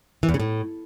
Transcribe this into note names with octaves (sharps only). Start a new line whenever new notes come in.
E3
E2
C#3
A2